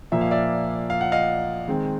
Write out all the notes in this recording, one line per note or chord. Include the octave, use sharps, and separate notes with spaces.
A#2 F3 A#3 E5
F5
D5 E5
F5
F#5
D#5 F5
D#3 G#3 C4